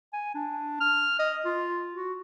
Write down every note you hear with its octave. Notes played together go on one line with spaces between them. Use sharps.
G#5
D4
F6
D#5
F4
F#4